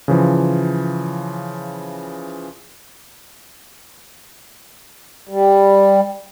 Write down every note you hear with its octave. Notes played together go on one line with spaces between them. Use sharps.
C#3 E3 F3
G3